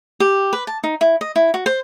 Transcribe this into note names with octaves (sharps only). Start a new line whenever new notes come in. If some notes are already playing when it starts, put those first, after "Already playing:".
G4
B4
A5
D#4
E4
D#5
E4
F#4
C5